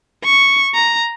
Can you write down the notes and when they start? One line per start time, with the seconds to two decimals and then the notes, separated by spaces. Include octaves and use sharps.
0.24 C#6
0.75 A#5